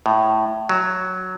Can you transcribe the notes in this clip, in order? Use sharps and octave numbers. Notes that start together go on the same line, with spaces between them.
A2
F#3